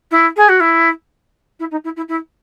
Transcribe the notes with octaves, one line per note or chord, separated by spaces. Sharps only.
E4
G#4
F#4
E4
E4
D#4
E4
E4
E4